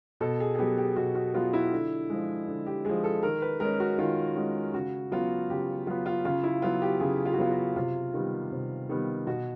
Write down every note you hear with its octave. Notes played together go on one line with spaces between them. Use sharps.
B2 A4
G#4
G#4
F#3 B3 G4
G4
B2 F#4
F#4
F#3 B3 F4
E4
D3
F3 G#3
D3
G4
F3 G#3 G#4
A4
D#3 A#4
B4
G#3 C#4 A#4
F#4
D#3 F4
G#3 C#4 F#4
C#3 F#4
F#3 B3 F4
C#3 G4
F#3 B3 F4
F4
C#3 F4
E4
F#3 B3 F4
G4
C#3 G#4
F4
F#4
F#3 B3 F4
F#4
C3 F4
D#3 G3 B3
C3
D#3 G3 B3
B2 F#4